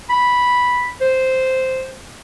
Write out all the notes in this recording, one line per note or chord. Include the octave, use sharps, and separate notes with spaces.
B5
C5